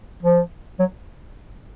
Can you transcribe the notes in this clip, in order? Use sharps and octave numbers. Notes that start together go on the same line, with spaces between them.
F3
F#3